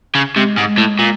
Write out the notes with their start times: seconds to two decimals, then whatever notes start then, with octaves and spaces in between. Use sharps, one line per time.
0.15 C#3
0.36 C3 G#3
0.58 G#2
0.78 A2
0.99 A#2